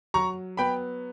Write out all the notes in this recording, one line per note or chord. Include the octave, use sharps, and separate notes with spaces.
F#3 A#5 C#6
B3 G5 B5